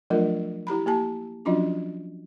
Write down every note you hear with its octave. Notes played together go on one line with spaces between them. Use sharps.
F3 F#3 A3 D4 F4 A#4
E4 G4 A#5 B5
A#3 G4 A5
F3 F#3 C#4 D4 F4 F#4